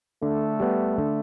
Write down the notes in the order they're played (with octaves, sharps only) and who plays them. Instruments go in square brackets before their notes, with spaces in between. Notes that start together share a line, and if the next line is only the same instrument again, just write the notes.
[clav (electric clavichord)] D3 [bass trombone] A3
[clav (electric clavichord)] G3 B3
D3